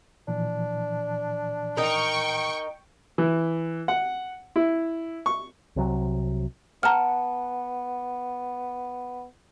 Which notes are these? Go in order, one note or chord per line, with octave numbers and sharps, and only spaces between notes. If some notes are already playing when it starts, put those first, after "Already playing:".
A#2 E3 F3 D4
D#4 A#4 G5 C#6
E3
F#5
E4
C#6
C2 C3 F#3
B3 F#5 A5 A#5 F6